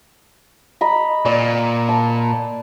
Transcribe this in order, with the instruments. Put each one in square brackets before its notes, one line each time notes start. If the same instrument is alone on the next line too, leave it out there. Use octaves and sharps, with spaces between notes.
[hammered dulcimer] D#5 A#5 B5
[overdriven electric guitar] A#2 [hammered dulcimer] D5
[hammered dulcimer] A5